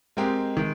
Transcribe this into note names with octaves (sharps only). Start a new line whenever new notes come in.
G#3 C4 G4 A#4
D#3 G#3